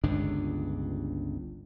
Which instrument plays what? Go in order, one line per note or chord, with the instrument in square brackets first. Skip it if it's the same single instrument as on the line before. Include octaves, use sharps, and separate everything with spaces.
[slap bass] G1 C#2 G2 D4